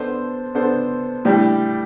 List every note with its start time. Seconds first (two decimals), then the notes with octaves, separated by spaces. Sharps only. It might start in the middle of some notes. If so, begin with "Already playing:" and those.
Already playing: B3 D4 A4 C5
0.55 B3 D4 A4 C5
1.25 A2 G3 D4 G4